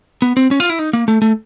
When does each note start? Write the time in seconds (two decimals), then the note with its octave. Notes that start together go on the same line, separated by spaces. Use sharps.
0.22 B3
0.37 C4
0.51 C#4
0.60 F4
0.70 E4
0.79 D#4
0.93 A#3
1.08 A3
1.22 A3